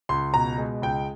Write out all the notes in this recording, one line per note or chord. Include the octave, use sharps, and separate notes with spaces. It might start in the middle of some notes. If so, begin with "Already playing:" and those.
C#2 C6
B2 A#5
G#3
C#2 G5